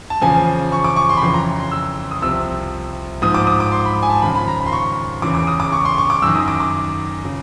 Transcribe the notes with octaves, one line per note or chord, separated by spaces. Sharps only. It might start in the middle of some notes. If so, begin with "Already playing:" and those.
A5
E2 C#3 F3 G#5
C#6
D6
C#6
C6
B5
F2 C#3 E3 C6
A#5
C6
E6
D#6
C2 C3 F3 E6
G#2 F3 D#6
D6
D#6
D6
C6
B5
G#5
A5
D#2 C#3 F3 B5
B5
A#5
B5
C6
C#6
E2 C#3 E3 D6
D6
D#6
D6
C#6
C6
C#6
D6
F#2 D#3 E6
D#6
D6
D6
C#3